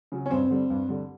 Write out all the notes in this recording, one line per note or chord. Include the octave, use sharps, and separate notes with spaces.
C#3 F#3
C#4
G2 C4
D3 G3
G2
D3 G3